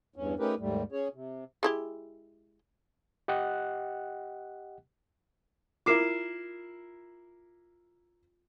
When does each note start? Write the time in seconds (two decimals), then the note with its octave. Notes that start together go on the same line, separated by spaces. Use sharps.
0.16 E2 G2 C#4
0.39 A3 C#4 D#4 G4 A#4 B4
0.59 D#2 G#2 G3 A3
0.92 C#4 G#4 C#5
1.14 C3
1.63 G#3 E4 G4
3.28 G4 D#5 F#5 G5 F#6
5.86 E4 F4 A#4 D6 C7 E7